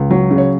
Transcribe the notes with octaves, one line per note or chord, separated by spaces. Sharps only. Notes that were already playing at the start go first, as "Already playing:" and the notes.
Already playing: C#2
F#3
C#3
C#5